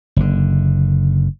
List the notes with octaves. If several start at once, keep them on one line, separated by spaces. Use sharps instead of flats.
F#1 D3